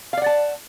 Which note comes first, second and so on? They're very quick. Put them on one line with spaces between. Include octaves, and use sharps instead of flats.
F5 D5 F#5 A5